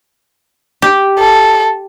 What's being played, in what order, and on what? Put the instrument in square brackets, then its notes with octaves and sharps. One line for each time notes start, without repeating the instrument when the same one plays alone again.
[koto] G4
[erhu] A4